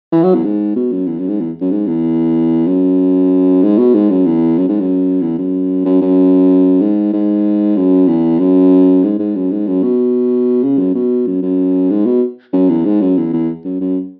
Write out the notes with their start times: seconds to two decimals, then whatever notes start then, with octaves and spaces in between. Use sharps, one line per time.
0.12 E3
0.23 F#3
0.34 E2
0.44 G#2
0.76 B2
0.92 F#2
1.07 E2
1.19 F#2
1.28 G#2
1.40 E2
1.61 F#2
1.71 G#2
1.87 E2
2.67 F#2
3.63 G#2
3.78 B2
3.94 G#2
4.10 F#2
4.26 E2
4.58 F#2
4.69 G#2
4.79 F#2
5.21 E2
5.38 F#2
5.85 F#2
6.01 F#2
6.81 G#2
7.13 G#2
7.76 F#2
8.08 E2
8.39 F#2
9.03 G#2
9.19 G#2
9.35 F#2
9.51 G#2
9.67 F#2
9.83 B2
10.63 C#3
10.78 F#2
10.95 B2
11.27 F#2
11.42 F#2
11.90 G#2
12.06 B2
12.53 F#2
12.69 E2
12.85 G#2
13.01 F#2
13.17 E2
13.33 E2
13.64 F#2
13.81 F#2